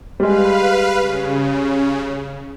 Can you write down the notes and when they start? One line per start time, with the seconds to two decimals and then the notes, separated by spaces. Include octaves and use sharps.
0.20 G3 G#3 B4 F5
0.99 C#3